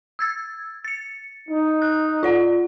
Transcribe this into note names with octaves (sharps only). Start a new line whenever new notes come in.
E6 G#6 A6
A6 C#7
D#4
F#6
F4 D5 F#5